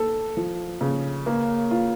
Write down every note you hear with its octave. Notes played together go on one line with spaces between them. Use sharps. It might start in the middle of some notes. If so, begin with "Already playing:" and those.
Already playing: A4
F3
C#3
A#3
F4